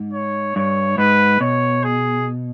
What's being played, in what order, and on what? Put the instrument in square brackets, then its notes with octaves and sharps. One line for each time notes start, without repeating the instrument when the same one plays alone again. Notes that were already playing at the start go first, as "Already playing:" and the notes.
Already playing: [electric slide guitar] G#2
[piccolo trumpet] C#5
[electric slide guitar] G2 [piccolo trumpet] C#5
[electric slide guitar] G#2 [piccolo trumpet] B4
[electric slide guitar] B2 [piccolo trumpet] C#5
[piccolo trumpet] G#4